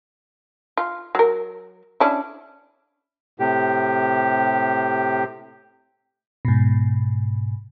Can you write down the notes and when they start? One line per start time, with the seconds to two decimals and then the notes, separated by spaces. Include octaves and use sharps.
0.78 F4
1.15 F#3 A#4
2.00 C#4 D4 E4
3.40 A2 C3 G4
6.45 G#2 B2